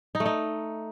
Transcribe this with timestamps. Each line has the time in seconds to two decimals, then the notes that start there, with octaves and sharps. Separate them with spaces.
0.15 D#4
0.20 A3
0.26 D#4